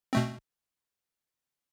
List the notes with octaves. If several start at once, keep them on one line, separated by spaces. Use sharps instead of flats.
B2 A3 C4